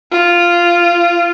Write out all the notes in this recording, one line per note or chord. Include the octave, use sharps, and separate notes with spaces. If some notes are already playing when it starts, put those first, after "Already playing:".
F4